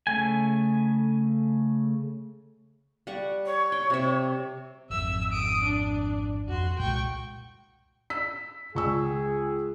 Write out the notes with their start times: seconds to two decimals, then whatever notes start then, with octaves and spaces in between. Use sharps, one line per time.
0.07 C#3 A3 G#5
3.07 G3 F#5 C#6
3.46 C#5
3.72 G5
3.90 C3 E5
4.90 G#1 F2 E5 E6
5.31 D#6 D7
5.63 D4
6.48 F2 F#4 C6
6.79 C2 A#2 G#3 G5 C#6
8.10 E6 B6
8.75 C#2 G#4 C#6 E6